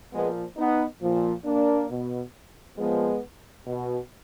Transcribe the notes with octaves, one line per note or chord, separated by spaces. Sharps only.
A#2 F3 G#3 B3
B3 D#4
A#2 F3
A#3 D4
B2
A#2 F3 G#3 B3
B2